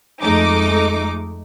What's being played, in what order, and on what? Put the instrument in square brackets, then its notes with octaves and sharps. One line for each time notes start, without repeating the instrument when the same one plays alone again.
[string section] F2 G#3 A3 D#4 D6